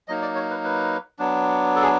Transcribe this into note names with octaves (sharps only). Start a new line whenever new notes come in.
F#3 A#3 D#4 D#5
D5
C#5
B4
B4
F#3 B3 D4
A4
G#4